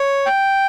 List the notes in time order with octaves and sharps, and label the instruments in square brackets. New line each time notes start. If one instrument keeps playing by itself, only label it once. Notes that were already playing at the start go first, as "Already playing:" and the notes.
Already playing: [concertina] C#5
G5